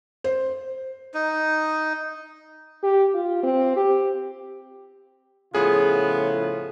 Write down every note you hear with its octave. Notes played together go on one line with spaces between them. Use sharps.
C5
D#4
G4
F4
C4
G4
A2 C#3 F3 B3 F4 G#4